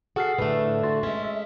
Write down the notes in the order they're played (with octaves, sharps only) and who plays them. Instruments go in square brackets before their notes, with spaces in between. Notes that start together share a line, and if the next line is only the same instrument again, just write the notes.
[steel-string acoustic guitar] F#4 A4 [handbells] G#4 F6 C7 [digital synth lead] F#5
[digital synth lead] A2 [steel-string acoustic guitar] D3 A3 [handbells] B4
[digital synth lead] F#4 [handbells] C6 A6
[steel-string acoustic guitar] G#3 C#4 [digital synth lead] E5